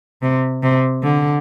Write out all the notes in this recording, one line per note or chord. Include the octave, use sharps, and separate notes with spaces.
C3
C3
D3